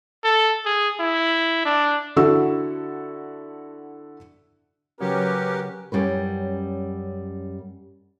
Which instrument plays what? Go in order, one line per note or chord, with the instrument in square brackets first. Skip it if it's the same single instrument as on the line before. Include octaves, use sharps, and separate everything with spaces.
[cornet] A4
G#4
E4
D4
[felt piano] D3 E4 F#4 A4 C#6 E6
[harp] C#3 F#3 [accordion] C#4 G4 [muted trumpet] A#4 [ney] B4
[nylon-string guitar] F#2 G3 C#4 B4